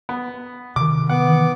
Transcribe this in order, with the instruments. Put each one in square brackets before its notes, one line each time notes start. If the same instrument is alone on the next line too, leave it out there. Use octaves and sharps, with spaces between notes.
[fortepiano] B3
[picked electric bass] C3 D#3 [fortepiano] D6
[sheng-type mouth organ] B3 D6 [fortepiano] F#5
[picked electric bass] D#3 E3